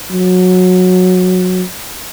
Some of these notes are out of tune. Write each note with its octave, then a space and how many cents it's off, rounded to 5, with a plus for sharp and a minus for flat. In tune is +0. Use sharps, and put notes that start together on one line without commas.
F#3 -15